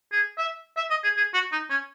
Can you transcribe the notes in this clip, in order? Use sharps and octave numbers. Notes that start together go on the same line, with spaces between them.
G#4
E5
E5
D#5
G#4
G#4
F#4
D#4
C#4